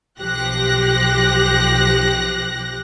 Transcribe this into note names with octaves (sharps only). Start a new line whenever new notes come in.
B1 F3 G4 F#6 A#6